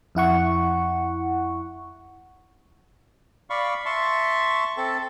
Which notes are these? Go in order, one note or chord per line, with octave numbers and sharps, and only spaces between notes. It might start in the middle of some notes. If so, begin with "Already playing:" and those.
F2 E4 F#5 C#6
D5 F5 B5 C#6
E5 A5 C6 C#6
C4 A4 A5